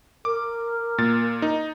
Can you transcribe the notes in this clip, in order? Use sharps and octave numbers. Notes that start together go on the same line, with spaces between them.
A#4 D6
A#2 A6
D#4